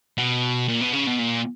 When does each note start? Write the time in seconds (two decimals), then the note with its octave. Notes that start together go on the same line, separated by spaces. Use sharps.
0.17 B2
0.68 A#2
0.81 B2
0.93 C#3
1.07 B2
1.19 A#2